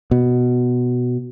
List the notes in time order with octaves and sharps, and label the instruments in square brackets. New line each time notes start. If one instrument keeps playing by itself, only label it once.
[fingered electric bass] B2